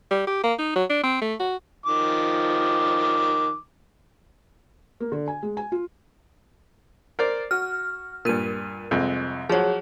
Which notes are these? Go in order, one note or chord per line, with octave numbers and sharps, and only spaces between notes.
G3
G4
A#3
D#4
F#3
D4
C4
A3
F#4
D#3 F3 D6
A#3
D3
G#5
G#3
G#5
F4
A#4 C5 D5
F#4 F6
G2 A#2 A#4 D#7
C2 F2 G#3
F3 F#3 G#4 C#5